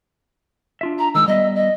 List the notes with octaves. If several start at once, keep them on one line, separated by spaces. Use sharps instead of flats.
D4 F4 E5
A#5
D#3 G#3 E6
G3 B3 D#5 E5
D#5